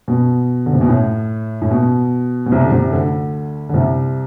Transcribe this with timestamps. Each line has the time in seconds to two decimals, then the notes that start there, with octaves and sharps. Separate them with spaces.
0.08 B2
0.66 D3
0.73 C3
0.81 B2
0.89 A2
1.62 A2
1.71 B2
2.46 B2
2.52 C2 C3
2.64 D3
2.72 C2 C3
2.92 D2 D3
3.69 D3
3.74 C2 C3